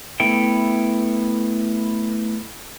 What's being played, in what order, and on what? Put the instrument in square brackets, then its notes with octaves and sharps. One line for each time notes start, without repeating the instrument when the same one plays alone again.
[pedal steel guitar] A3 B3 E4 G5